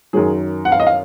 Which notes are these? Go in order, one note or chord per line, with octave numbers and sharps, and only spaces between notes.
F#2 D#3 F#3 G#4
F#5
F5
D#5
F5